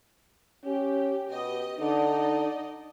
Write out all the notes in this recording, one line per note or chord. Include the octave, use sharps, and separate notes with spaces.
C#4 G4
B2 G4 D#5
D3 D#4 D5 D#5